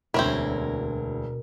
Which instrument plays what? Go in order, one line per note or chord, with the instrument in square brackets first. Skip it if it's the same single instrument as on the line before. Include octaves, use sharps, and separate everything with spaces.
[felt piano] E1 D2 [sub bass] B2 [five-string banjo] C4 C#4 E4 [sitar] A#4